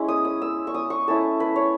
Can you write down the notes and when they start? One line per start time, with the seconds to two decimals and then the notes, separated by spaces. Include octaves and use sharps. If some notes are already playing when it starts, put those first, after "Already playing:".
Already playing: G#3 C#4 E4
0.08 D#6
0.25 D#6
0.42 E6
0.67 C#6
0.74 D#6
0.90 C#6
1.08 A3 C#4 E4 A5
1.40 B4
1.56 C#5